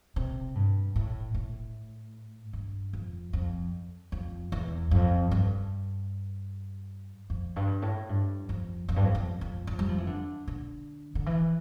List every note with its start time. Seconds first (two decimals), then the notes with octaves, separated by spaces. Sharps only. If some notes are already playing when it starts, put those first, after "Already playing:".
0.16 C3
0.55 G2
0.96 A2
1.34 A2
2.53 G2
2.93 F2
3.33 F2
4.12 F2
4.52 E2
4.91 F2
5.31 G2
7.30 F2
7.56 G2
7.82 A2
8.09 G2
8.49 F2
8.89 F2
8.96 G2
9.04 F2
9.15 F2
9.41 F2
9.67 F2
9.79 G3
9.89 F3
9.98 E3
10.07 D3
10.47 D3
11.15 D3
11.26 E3